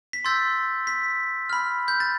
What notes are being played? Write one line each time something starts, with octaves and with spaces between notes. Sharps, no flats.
B6
C6 E6 G6 A6
B6
B5 F6
G6
A6